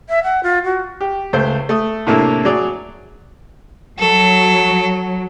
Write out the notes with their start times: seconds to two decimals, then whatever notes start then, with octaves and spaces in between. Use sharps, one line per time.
0.09 E5
0.23 F#5
0.43 F4
0.64 F#4
1.01 G4
1.33 C#2 A3 C5
1.69 A3 D#6
2.07 A2 C3 A#3 D4 E4 A4
2.45 F#3 G#4 D5
3.99 F#3 A4